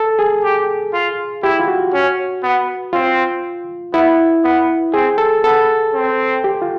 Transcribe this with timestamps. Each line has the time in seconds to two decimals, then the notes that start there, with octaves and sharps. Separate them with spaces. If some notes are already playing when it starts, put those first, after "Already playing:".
Already playing: A4
0.19 G#4
0.43 G4
0.93 F4
1.43 E4 G4
1.60 F4
1.68 F#4
1.93 C#4
2.43 B3
2.93 C4 F4
3.93 B3 E4
4.44 B3
4.93 C4 G#4
5.18 A4
5.44 B3 A4
5.94 C4
6.44 G4
6.62 F4